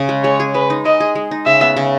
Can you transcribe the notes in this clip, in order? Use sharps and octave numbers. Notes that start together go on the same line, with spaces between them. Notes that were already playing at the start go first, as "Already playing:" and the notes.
Already playing: C#3 C#4
G#3
G#3 C#5
G#4
G#3 B4
D#4
G#3 D#5
G#4
G#3
D#4
C#3 E5
B3
C#3